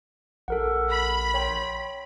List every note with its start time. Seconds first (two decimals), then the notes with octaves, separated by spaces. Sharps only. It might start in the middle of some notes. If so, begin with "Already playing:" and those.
0.48 A#1 A4 A#4 F#5
0.90 B5
1.34 C#5 G5 C6